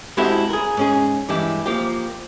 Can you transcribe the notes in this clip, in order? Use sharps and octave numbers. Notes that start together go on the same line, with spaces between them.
G#3 C4 E4 F#4 G4 A4
G#4 A#4
G#2 C#4 G#4
G2 E3 G#3 E4 G4
F3 A#3 G4